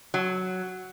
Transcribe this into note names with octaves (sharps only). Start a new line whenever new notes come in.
F#3